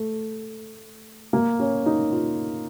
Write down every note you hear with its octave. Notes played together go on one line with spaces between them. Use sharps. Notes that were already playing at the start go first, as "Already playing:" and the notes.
Already playing: A3
A#3
C#4
D#4
F4